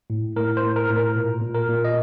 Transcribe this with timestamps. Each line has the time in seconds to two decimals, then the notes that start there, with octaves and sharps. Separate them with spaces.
0.10 A2
0.36 A2 A#4
0.57 C5
0.62 A2
0.76 A#4
0.89 A2
0.96 A#4
1.15 A#2
1.41 A#2
1.54 A#4
1.69 A#2
1.85 D#5